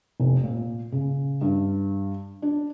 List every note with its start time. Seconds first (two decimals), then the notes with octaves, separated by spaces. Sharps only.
0.20 F1
0.44 A#2
0.92 C#3
1.41 G2
2.42 D4